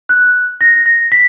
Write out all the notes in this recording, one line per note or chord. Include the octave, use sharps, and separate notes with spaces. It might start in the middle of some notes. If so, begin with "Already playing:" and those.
F#6
A#6
A#6
B6